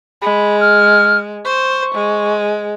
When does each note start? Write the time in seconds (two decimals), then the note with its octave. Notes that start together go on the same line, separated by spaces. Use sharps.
0.22 G#3 B5
0.60 F6
1.45 C5 C#6
1.94 G#3